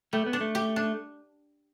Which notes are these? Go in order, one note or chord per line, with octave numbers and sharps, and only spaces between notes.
G3 A3
B3
D4
A3
G4
D4